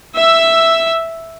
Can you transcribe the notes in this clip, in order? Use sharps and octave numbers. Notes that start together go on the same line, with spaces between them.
E5 E6